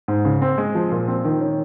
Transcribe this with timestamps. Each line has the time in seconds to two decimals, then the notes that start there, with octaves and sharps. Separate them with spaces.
0.08 G#2
0.25 C#3
0.42 C4
0.58 G#3
0.75 F3
0.92 A#2
1.08 C4
1.24 D#3
1.41 C#4